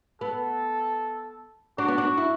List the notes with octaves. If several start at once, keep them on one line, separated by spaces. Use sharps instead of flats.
B3 A4
D4 F#4
B3
D4
E4